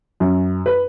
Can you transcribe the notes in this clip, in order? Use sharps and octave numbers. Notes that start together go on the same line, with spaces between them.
F#2
B4